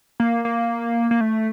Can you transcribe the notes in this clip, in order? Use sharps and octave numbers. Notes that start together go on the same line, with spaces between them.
A#3
A#3
A#3
A3